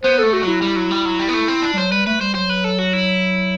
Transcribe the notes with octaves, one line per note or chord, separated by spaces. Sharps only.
B3 C5
A3 A4
F#4
F#3 E4
G3
F#3
G3
F#3
G3
B3
A3
C4
D4
G3
F#3 C5
G3 B4
A3 B4
G3 C5
F#3 C5
B4
A4
F#4
E4